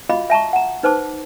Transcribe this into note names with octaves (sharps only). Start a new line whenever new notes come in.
F4 F#4 D#5 F5 B5 D6
E5 A5 A#5 C#6
F#5 A#5
D#4 B4 C5 A5 D6